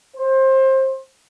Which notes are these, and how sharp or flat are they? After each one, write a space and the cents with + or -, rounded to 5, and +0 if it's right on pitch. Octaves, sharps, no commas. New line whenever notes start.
C5 +25